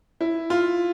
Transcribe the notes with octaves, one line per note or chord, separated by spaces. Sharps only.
E4
F4